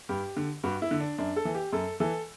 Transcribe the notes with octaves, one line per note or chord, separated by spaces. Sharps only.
G2 G4
D3
G2 F#4
E4
D3
D4
F#2 D4
A4
E3
G4
F#2 A4
E3 A4